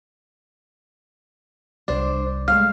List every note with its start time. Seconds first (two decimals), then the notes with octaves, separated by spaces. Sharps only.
1.88 C2 D4 C5 D5
2.48 G#3 A3 F5 F6